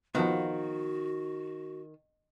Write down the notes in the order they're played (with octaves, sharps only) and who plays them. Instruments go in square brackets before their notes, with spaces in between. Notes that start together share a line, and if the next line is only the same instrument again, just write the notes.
[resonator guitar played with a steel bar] D#3 [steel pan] F3 B3 [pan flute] F#4